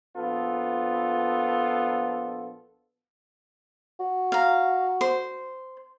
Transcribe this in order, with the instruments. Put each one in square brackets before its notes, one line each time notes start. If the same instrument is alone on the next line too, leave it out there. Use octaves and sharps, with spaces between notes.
[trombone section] A#1 B3 F4 A4
[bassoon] F#4
[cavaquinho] F5 A#5
C5